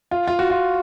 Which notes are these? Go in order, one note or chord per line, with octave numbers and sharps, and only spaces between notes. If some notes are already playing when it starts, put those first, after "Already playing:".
F4
F4
F#4
F4